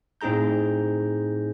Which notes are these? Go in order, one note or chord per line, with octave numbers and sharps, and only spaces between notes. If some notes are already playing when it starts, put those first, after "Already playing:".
A2 C4 D#4 G#4 A#5 G6